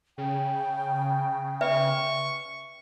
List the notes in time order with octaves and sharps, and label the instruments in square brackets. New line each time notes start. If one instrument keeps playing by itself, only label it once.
[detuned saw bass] C#3 [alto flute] G5
[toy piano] B4 D5 E5 [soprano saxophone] C#6